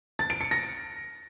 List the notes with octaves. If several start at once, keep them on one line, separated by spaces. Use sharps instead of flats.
A6
D7
C#7
A#6